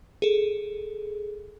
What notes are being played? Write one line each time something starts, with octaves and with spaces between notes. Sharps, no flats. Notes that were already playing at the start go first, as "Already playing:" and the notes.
G#4 A4